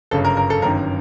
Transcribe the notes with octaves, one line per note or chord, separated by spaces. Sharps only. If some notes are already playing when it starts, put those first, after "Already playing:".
G1 F#2 C#3 A4
A#4
A#4
A4
G1 F#2 D#3 A#4